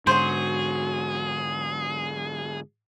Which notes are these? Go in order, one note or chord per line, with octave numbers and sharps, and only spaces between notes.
G#2 D3 F#3 F#4 G#4 C5